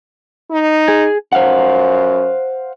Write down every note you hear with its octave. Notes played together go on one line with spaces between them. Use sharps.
D#4
G#4
F#2 C5 F5 F#5